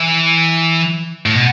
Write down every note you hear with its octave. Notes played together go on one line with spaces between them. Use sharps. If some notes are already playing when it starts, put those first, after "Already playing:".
Already playing: E3
A2
B2